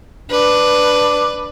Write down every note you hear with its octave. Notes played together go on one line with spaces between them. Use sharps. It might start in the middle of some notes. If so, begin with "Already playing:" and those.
D4 B4